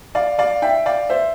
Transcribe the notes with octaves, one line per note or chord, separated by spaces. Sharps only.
D5 F5
D5 F5
E5 G5
D5 F5
C5 E5